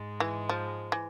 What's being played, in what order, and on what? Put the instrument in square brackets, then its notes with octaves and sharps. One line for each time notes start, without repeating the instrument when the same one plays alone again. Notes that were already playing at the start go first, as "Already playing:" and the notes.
Already playing: [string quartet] G#2 G#3
[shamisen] E3
F3
E3